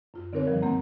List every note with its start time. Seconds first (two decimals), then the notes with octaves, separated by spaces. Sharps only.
0.14 F#2 F4
0.33 D3 C4 D#4 A#4 B4 C#5
0.46 G2 C3 D#3 F3 G3
0.62 E2 G2 A#3 C4 F#5 A#5